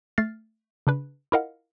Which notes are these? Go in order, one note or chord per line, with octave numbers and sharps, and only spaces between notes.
A3 F6 A6 C7
C#3 D4 B4
E4 F4 A#4 D#5 F5 F#5